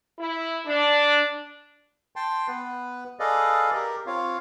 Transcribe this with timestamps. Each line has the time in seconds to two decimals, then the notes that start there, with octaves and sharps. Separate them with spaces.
0.20 E4
0.67 D4
2.16 G5 A5 C6
2.48 B3 B4
3.20 G#4 A4 B4 D5 D#5 F5
3.74 G4 A#4
4.06 C4 F4 C#5 F5